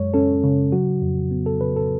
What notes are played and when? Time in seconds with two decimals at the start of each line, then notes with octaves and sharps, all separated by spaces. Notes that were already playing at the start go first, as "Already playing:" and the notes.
Already playing: F#2 G#3 C#5
0.14 C#4 A4
0.44 C#3
0.72 F#3 F#4
1.02 F2
1.31 B3
1.46 A4
1.61 C#3 B4
1.76 A4